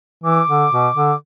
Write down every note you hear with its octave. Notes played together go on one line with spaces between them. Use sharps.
E3 D6
D3
B2
D3